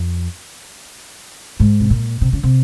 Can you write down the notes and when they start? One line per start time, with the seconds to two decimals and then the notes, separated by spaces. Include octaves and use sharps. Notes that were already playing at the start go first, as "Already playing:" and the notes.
Already playing: F2
1.60 G#2
1.80 C3
1.90 A#2
2.21 C3
2.33 C#3
2.43 C3